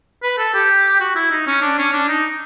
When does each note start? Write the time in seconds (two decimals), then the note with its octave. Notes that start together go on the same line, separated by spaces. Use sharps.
0.23 B4
0.39 A4
0.54 G4
1.01 F#4
1.15 E4
1.31 D#4
1.47 C#4
1.62 D4
1.78 C#4
1.93 D4
2.08 D#4